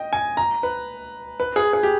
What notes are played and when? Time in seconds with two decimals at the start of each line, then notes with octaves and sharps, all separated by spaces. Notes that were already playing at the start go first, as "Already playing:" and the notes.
Already playing: D#5 G5
0.13 G#5
0.37 A#5
0.63 B4
1.40 B4
1.56 G#4
1.73 G#4
1.83 G4